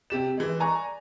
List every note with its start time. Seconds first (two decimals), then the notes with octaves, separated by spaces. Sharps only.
0.10 C3 G4 E7
0.38 E3 G#3
0.60 D5 G#5 A#5 C#6